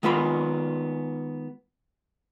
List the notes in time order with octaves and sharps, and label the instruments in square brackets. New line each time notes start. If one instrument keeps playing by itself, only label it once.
[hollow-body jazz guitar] D#3 G#3 B3 F4 F5 B5